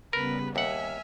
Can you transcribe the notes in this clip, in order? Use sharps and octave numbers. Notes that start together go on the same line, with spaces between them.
C#3 G3 B3 A#4 B4
D#2 E5 F#5 G#5 F6